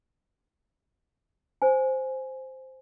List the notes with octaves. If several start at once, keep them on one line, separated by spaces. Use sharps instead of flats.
C5 G#5